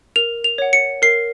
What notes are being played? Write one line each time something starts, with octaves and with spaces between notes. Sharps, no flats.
A#4 F7
F7
C#5 F#5
C#7
A#4 C7